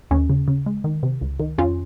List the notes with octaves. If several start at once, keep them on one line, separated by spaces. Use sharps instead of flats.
D#2 C#4
C#3
C#3
G#3
D#3
C3
C#2
D#3
F2 C#4 F4